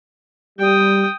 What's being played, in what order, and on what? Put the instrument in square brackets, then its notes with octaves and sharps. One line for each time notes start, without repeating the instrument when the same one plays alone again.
[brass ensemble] G3 [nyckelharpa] G5 D#6